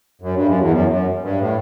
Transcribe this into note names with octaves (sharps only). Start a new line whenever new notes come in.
F#2
G2
F#2
E2
F#2
F#2
G2
A2